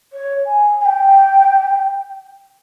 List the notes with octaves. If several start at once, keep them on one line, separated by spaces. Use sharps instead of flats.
C#5
G#5
G#5
G5